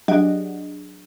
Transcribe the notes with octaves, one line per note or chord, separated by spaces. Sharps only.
F#3 D4 G4 G#4 D#5 F#5